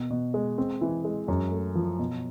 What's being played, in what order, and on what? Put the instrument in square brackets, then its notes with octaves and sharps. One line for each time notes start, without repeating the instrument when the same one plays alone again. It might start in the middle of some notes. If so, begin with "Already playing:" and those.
Already playing: [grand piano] B2
B2
G#3
C4
E3
G#3
F#2
A3
F3
B2